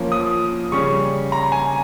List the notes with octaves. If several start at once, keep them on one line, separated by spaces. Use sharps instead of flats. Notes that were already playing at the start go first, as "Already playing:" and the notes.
Already playing: F3 A#3 C#4
D#6
C#3 G3 C#4 C#6
A#5
G#5